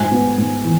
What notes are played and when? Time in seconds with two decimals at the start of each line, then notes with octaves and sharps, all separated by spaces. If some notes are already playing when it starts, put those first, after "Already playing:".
Already playing: G#2 G#5
0.11 B3
0.38 G#2
0.64 E3